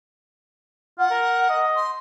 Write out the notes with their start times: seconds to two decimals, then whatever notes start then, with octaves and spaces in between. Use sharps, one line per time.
0.98 F4 F#5
1.11 A#4
1.49 D#5
1.76 C6